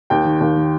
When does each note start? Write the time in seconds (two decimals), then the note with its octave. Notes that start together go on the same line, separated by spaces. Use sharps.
0.10 D#2 G5
0.25 D#3
0.40 D#2
0.56 D#3